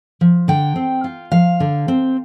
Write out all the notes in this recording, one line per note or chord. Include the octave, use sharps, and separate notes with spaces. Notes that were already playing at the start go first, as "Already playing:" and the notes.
F3
D3 G5
C4
F4
F3 F5
D3
C4